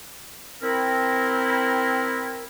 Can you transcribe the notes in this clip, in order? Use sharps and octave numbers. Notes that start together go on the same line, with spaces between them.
C4 E4 A#4